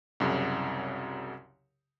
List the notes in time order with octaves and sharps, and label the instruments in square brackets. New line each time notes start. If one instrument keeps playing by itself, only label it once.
[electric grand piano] C2 F#2 C#3